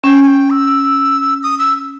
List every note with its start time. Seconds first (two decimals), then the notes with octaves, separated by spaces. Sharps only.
0.04 C#4 G5
0.23 G#5
0.27 G5
0.50 E6
1.43 D#6
1.59 E6